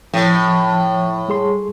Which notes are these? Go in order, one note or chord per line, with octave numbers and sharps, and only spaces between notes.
A2 F3
G3 G#4 C6